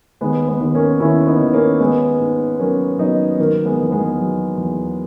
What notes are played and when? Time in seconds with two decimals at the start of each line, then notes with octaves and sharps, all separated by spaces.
0.21 D#2 G#3 B3
0.48 G#3 B3
0.60 D#2
0.75 A#3 C#4
1.00 D#2 C#4 E4
1.27 B3 D#4
1.40 D#2
1.53 A#3 C#4
1.80 D#3 G#3 B3
2.20 G#2
2.59 F#3 A#3 C#4
2.99 F#3 B3 D#4
3.39 D#3 A#3
3.65 G#3 B3
3.79 E2
3.91 G#3 B3
4.18 F#3
4.57 E2